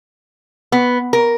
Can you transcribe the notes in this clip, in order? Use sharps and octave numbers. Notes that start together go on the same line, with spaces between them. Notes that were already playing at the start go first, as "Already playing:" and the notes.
B3
A#4